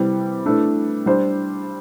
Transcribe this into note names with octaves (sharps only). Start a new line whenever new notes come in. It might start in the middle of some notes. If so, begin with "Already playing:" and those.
Already playing: C3 E3 G3 C4
E3 A3 D4
G3 D4 C5